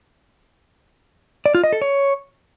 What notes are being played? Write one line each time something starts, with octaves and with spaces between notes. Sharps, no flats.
D5
F4
D#5
A4
C#5